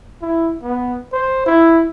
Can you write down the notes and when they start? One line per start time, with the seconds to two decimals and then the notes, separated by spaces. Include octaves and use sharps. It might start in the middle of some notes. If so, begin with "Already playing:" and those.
0.22 E4
0.63 B3
1.13 C5
1.46 E4